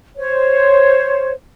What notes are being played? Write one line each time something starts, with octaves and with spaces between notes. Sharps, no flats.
C5 C#5